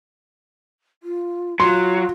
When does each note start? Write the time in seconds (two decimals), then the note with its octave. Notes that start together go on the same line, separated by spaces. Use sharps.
1.03 F4
1.60 F#3 F4 C6